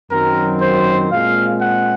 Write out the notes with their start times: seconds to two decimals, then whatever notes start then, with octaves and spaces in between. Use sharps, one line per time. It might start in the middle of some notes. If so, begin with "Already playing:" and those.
0.10 F#2 D#3 F#3 C4 A#4
0.61 C5
1.11 A#2 G#3 C4 F5
1.62 F#5